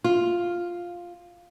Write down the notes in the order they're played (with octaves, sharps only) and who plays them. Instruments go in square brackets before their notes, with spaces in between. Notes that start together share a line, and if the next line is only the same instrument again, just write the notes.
[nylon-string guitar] F4